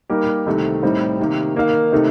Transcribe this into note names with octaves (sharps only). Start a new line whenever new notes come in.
G3 A#3 D#4 G4 A#4
C2 C3 D#3 A3
A2 G3 C4 D#4
C3 D#3 A#3
D#3 A#3 D#4 A#4 F5
C3 D#3 A3 D#4